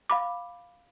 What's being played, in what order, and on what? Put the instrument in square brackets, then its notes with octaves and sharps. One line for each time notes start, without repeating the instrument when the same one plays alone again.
[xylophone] F5 B5 D6